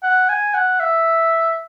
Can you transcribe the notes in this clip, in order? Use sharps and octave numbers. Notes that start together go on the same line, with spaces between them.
F#5
G#5
F#5
E5